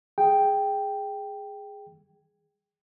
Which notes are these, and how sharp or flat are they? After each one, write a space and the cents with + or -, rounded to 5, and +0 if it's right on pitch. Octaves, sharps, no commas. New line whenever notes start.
G#4 +0 G5 +0